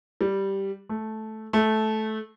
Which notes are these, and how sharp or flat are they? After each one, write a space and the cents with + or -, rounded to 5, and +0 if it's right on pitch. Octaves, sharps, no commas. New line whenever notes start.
G3 -5
A3 -10
A3 -15